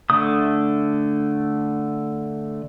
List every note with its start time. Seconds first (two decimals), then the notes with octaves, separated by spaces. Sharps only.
0.10 D3 A3 D#6